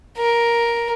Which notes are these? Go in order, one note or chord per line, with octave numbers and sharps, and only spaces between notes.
A#4